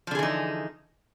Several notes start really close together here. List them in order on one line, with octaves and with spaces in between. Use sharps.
F3 D3 G#4 E3 D#4